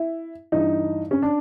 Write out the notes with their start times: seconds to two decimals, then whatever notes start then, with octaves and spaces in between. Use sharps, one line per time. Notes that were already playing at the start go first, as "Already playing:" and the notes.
Already playing: E4
0.52 G2 E3 D#4
1.11 C#4
1.22 D4